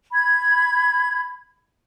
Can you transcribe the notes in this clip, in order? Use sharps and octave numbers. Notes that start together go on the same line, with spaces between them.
B5 G#6